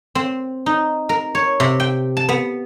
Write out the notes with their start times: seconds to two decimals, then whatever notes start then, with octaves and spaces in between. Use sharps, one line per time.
0.15 C4
0.66 D#4
1.09 A#4
1.35 C#5
1.60 C3
1.80 G5
2.17 A5
2.29 B3